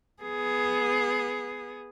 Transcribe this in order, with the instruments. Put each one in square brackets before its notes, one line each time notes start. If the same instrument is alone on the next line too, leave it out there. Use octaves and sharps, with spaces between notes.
[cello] B3 G#4